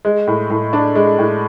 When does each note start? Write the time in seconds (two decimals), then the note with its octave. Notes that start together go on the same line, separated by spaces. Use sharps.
0.05 G#3
0.27 A2
0.50 A2
0.73 D4
0.95 G#3
1.19 A2